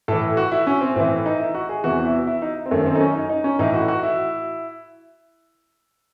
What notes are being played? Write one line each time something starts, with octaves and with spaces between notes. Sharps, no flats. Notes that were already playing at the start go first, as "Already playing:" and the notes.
A2 E3 A4
F#4
E4
C#4
C4
A2 E3 C4
D#4
E4
F#4
G#4
E2 C3 E3 F#4
E4
E4
D#4
C4
F#2 D#3 A3
C4
D#4
C#4
D#4
D#4
C#4
A2 E3 D#4
F#4
F#4
E4